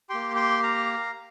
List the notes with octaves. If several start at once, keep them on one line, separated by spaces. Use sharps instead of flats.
A#3 G4 G5 C6
G5 C6
F5 A#5